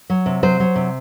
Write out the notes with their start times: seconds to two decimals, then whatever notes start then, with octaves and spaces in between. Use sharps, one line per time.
0.10 F#3
0.26 C3
0.43 F#3 C5
0.60 F#3
0.76 C3